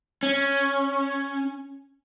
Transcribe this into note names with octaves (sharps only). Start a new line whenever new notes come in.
C#4